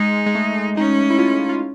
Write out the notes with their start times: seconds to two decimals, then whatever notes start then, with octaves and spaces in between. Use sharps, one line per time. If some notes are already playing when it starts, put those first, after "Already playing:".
Already playing: G#3 D#4
0.26 G#3
0.35 A3
0.77 C#4 D#4
1.10 E4
1.18 F4
1.49 F4